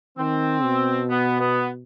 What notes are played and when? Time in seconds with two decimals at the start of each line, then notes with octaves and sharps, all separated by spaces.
0.18 D#3 C4
0.63 B2
1.10 B3
1.40 B3